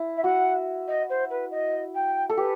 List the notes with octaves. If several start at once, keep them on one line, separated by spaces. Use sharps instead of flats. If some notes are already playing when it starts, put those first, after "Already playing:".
Already playing: E4
E5
F#4 F#5
D#5
C5
B4
D#5
G5
A4
G4 B4